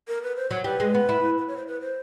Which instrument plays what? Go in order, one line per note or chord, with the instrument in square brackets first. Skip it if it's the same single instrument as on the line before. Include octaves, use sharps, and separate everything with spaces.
[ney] A#4
B4
C5
[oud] F#3 [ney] C#5
[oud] G3 [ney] B4
[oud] G#3
B3
E4
[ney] B4
C#5
C5
B4
C5